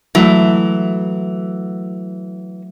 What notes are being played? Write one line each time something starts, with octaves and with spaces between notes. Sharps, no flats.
E3 F#3 A3